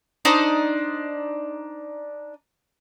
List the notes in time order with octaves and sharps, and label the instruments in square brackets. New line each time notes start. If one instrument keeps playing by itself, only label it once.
[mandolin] D4 D#4 C5